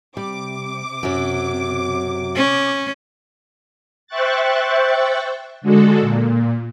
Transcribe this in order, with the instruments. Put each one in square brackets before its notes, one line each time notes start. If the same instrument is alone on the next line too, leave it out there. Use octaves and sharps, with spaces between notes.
[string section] C3 D6 [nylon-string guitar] G3
[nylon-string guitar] F#2 F#3
[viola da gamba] C#4
[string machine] C5 E5 G5 C#6 F#6 A6
D3 G#3 F#4 A4
A#2